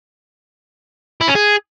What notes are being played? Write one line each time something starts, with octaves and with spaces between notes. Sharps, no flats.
E4
C#4
G#4